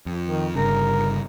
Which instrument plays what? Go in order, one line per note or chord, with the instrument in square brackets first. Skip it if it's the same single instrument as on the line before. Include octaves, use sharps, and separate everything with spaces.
[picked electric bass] F2
[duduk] D#3
[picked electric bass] G1 G2 C#3 [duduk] A#4